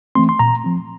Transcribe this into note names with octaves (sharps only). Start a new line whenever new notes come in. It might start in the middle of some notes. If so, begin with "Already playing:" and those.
E3 A3 C4 C6
C6
A#2 A#5
F3 C4